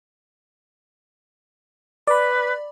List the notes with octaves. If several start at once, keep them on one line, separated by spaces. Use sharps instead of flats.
B4 D5 B5